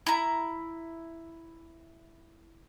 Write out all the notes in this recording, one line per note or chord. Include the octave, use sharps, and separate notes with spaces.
E4 A#5